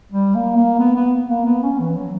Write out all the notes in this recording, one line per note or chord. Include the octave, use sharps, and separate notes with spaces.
G3
A#3
A#3
B3
B3
A#3
B3
C#4
E3
F#3